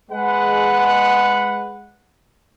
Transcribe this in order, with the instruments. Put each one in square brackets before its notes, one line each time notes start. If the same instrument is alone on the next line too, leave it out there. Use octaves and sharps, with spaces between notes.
[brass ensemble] G#3 B4 F#5